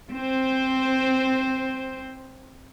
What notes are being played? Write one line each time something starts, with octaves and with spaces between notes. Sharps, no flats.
C4 C5